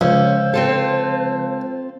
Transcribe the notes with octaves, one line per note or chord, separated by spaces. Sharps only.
C#2 C#3 F3 C#4 C5
C4 F4 A4